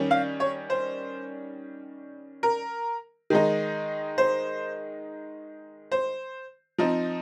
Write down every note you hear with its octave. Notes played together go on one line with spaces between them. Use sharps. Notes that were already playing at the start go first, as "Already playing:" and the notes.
Already playing: D#3 G3 C#4
F5
C#5
C5
A#4
D#3 G#3 D#4
C5
C5
F3 C4 D#4